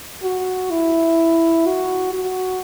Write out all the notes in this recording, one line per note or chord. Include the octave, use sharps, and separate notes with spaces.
F#4
E4
F#4
F#4